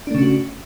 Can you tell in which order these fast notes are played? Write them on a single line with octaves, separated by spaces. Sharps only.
D4 A3 C#3 C#4 F#4